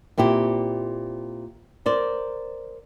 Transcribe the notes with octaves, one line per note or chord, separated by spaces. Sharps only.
A#2 C4 E4 G4
A#4 C5 D5